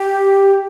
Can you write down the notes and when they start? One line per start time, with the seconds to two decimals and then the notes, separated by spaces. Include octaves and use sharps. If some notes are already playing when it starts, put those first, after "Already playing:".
Already playing: G4